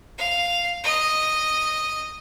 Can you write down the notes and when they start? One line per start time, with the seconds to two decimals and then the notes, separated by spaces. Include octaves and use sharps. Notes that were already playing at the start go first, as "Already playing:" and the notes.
0.18 F5
0.84 D#5